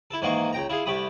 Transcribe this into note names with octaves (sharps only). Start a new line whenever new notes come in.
E4 A4
G#2 D#3 E3 A#3 D#4 C#6
C#2 G5 A#5
E4 F4 G#4
C2 A3 G4 B5 D#6